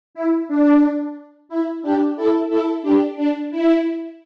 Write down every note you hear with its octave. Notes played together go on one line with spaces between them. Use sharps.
E4
D4
E4
D4 G4
E4 A4
E4 A4
D4 G4
D4
E4